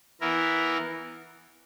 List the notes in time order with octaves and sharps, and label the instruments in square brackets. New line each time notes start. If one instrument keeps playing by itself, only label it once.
[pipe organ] E3 B3 E4 A#4